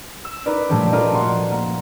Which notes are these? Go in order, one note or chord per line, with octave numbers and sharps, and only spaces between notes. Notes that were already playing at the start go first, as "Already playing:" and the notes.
E6
D#4 A#4 B4 D5
A#2 F3 G3 A3 C#4 G4
F4 A4 A#4 D5 D#5
A#3 F#4 C6
A#3